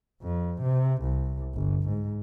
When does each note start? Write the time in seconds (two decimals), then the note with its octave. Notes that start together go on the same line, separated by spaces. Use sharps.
0.23 F2
0.62 C3
1.03 C2
1.54 G1
1.89 G#2